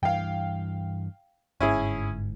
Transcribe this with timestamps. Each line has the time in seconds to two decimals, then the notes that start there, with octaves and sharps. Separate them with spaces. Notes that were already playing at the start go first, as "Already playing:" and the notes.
0.03 G2 E3 F5 G5
1.60 G1 G#2 C#4 E4 G#4